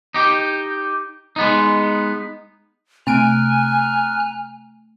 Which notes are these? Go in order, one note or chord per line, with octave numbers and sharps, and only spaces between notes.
D#4 G4
G#3 B3 D#4
C3 A3 G#5 A#5 F6 F#6 D7